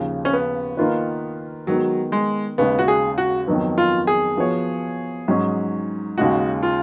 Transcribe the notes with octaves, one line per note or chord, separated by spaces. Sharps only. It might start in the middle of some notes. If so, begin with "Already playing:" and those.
Already playing: D#2 C#3 F3
C#4
B3
D#3 A#3 F4 B4
D#3 F#3 G#3 B3
G#3
D#2 C#3 G#3 B3
F#4
G#4
F#4
F2 D#3 F#3 B3
F4
G#4
F3 B3 F#4 C#5
G#2 F#3 C#4
D#2 C#3 G#3 D#4 F#4
F4